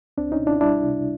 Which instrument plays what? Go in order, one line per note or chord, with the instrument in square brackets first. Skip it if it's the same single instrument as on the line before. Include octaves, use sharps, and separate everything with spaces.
[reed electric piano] C#2 C4 D4
C#4 D#4
B2
D4 E4
G3 D4 E4
C3